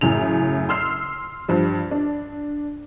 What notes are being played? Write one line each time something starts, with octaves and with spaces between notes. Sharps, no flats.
F#2 A2 C#3 F7
C6 E6 F6 C7
G2 F3 G3
D4